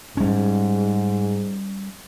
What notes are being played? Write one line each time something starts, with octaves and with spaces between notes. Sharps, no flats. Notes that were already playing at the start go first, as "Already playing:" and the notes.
G#2 G3 C#4